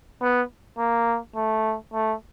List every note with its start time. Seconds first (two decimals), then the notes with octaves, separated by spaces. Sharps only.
0.22 B3
0.78 A#3
1.36 A3
1.94 A3